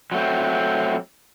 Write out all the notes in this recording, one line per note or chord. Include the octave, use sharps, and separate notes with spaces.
F#3 A3 C4